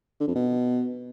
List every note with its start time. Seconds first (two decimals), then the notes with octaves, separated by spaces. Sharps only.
0.20 D3
0.28 F2
0.35 B2